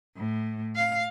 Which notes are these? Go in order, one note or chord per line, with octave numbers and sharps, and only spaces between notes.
A2
F5